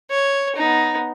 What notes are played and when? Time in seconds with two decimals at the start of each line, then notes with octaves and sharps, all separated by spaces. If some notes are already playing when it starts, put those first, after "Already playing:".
0.10 C#5
0.56 B3 D#4